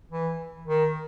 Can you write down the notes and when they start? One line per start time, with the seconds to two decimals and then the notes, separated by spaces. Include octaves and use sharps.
0.11 E3
0.67 D#3